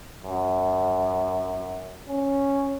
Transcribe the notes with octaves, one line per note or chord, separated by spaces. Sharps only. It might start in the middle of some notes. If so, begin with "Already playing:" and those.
F#2
C#4